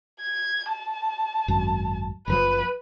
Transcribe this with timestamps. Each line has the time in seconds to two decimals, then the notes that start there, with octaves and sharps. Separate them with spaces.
0.21 G#6
0.72 A5
1.48 G#1 F#2
2.28 F#1 C#3 F3 B4